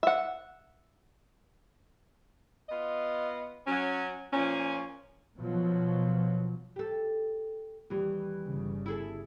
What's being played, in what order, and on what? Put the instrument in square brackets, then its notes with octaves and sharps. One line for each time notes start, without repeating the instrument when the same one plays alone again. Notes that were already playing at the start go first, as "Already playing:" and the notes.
[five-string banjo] E5 F#5
[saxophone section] B3 F4 D#5
F#3 C#4
A#2 F3 C#4
[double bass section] B2 F3 F#3
[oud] G4 A4
[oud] D#2 E3 [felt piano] G3
[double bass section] G1 C#3
[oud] E4 G#4 A4